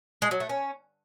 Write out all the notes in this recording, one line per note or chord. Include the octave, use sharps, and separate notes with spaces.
G#3
F#3
A3
C#4